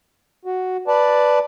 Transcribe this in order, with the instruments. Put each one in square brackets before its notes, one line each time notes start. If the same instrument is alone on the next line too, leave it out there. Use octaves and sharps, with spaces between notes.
[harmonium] F#4
B4 D5 A5